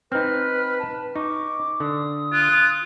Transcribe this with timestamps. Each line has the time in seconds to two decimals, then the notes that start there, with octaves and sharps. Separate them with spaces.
0.12 C4 D#4 B4 F6
0.80 A5
1.16 D#4 C#6 D6
1.80 D3 D#6
2.33 F4 F#6